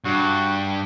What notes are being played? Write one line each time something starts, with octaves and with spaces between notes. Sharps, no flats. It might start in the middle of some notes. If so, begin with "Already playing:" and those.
G2 F#4